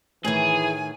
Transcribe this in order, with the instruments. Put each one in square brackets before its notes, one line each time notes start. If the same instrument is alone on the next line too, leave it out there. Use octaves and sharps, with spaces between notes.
[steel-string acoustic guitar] A2 D#3 [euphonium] E3 [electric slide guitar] G#4 [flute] G#5